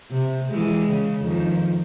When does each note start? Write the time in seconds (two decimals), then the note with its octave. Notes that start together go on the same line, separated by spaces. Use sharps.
0.10 C3
0.50 E3 G#3
0.90 C#3
1.21 F2 D#3 F3